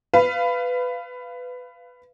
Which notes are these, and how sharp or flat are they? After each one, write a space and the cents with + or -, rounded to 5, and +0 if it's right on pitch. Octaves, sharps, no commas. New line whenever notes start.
B4 +15 F5 -15